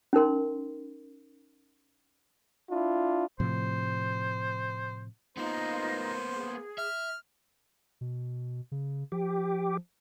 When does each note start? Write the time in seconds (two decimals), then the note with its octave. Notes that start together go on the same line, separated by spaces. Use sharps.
0.13 C#4 D#4 A#4 C6
2.70 D4 E4 F4
3.40 A2 C3 F3 C5
5.37 A#3 B3 D#4 F4 C5
6.35 G#4
6.78 E5 F6
8.01 B2
8.72 C#3
9.12 F3 G4